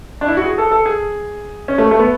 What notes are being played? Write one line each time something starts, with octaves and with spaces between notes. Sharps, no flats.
D4
E4
F#4
G#4
A4
A4
G#4
C#4
A3
A3
B3